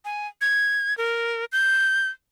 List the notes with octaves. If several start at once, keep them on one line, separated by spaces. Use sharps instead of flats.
G#5
G#6
A#4
G6